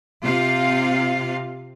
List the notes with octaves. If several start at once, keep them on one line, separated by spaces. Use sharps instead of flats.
C3 F4 F5